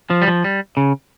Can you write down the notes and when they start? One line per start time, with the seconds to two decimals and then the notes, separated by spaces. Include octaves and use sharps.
0.10 F3
0.22 G3
0.27 F3
0.44 G3
0.77 C#3